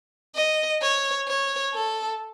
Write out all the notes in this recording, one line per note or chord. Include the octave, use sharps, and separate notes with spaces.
D#5
C#5
C#5
A4